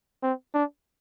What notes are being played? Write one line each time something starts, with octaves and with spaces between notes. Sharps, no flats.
C4
D4